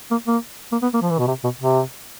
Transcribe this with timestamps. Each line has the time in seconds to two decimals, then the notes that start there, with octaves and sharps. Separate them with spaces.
0.11 A#3
0.27 A#3
0.72 A#3
0.82 B3
0.94 A#3
1.02 F3
1.10 E3
1.19 B2
1.27 C3
1.44 B2
1.60 C3